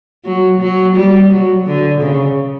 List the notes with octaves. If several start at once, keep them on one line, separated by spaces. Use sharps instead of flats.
F#3
F#3
G3
F#3
D3
C#3